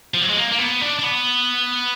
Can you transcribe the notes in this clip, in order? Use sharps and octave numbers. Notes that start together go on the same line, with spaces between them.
F3
F#3
G#3
A#3
A#3
B3
D4
D4
B3